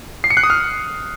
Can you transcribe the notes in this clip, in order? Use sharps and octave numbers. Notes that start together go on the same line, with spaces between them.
C7
C#7
F#6
D#6
F6